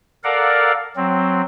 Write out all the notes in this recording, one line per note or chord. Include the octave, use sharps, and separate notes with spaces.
A4 A#4 D5 F5 F#5
F#3 C4